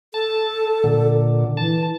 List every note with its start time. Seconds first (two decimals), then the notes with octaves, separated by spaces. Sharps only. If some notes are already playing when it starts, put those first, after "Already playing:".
0.14 A4 A5
0.84 A#2 D3
1.57 E3 A5